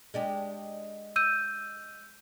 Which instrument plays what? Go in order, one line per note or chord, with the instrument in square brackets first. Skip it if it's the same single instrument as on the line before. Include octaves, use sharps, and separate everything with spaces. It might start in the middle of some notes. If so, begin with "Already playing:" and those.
[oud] G#3 D4 G4
[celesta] E6 G6 D#7